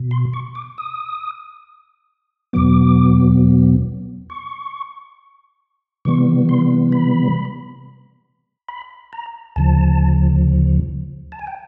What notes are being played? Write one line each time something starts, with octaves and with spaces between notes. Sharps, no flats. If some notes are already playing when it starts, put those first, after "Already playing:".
Already playing: B2
C6
C#6
D6
D#6
E2 B2 F#3 B3 D6
C#6
C3 E3 G3 B3 C#6
C6
B5
B5
A#5
D2 C#3 F3 A5
A5
G#5
G5